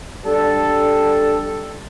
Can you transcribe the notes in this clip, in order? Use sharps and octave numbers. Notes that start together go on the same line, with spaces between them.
G3 D4 A4